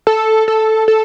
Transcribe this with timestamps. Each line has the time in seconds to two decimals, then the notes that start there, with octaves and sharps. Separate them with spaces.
0.07 A4
0.48 A4
0.88 A4